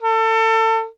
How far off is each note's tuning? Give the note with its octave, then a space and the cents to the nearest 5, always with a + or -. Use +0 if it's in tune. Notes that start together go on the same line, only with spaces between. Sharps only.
A4 +30